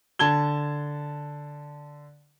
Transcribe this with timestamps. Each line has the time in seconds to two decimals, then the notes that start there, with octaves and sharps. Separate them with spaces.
0.19 D3 A5 G#6 G7